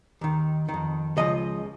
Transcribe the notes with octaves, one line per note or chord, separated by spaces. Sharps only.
D#2 D#3
D#3
F2
C#2 C#3 F3 D#5